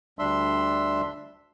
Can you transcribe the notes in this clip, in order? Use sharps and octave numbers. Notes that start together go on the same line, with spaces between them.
D2 G3 D4 E5 C6 E6